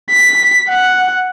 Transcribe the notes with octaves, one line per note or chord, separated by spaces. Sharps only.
B6
F#5